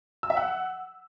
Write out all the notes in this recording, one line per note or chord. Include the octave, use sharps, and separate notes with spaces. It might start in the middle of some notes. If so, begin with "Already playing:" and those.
E6
E5
F#5